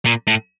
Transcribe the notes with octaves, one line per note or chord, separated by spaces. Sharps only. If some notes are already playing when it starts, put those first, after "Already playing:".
A#2
A2